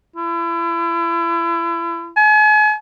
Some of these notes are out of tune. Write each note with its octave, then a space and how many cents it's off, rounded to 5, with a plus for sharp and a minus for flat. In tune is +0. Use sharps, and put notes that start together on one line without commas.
E4 +35
G#5 +40